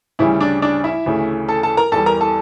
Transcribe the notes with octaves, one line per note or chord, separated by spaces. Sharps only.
D2 C#3 E3 G3 E4
D4 D5
D4 D5
E4 E5
D2 C#3 E3 A3
A4 A5
A4 A5
A#4 A#5
E2 E3 G3 A4 A5
A#4 A#5
A4 A5